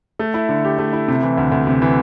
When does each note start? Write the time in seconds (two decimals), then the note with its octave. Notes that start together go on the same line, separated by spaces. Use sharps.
0.19 A3
0.34 E4
0.49 D3
0.64 G4
0.79 A3
0.93 E4
1.08 C3
1.23 E3
1.38 D2
1.52 D2
1.67 C3
1.82 E3